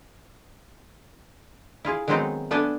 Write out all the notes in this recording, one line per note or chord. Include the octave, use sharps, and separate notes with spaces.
E4 F4 G#4
D#3 F#3 G#3 B3 C4 D#4
A3 B3 D4 A4 B4 G#5